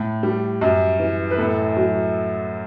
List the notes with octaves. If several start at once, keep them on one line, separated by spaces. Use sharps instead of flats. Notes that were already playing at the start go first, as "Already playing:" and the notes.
Already playing: A2
G3
F#2
E3
B4
A2 A4
F#3